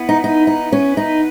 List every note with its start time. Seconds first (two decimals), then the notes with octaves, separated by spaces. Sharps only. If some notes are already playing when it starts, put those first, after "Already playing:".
Already playing: B3 E4 B4
0.09 D#4
0.24 D#4
0.47 D#4
0.72 C#4
0.97 D#4